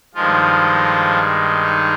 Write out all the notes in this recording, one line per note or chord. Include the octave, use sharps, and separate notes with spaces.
G2 D#3 F3 G#3 F4
D#4